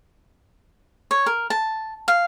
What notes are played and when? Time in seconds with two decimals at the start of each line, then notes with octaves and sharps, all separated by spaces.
1.11 C#5
1.26 A#4
1.50 A5
2.08 F5